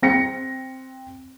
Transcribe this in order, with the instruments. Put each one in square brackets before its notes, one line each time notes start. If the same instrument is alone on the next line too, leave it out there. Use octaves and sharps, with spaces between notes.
[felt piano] C4 A#6 C#7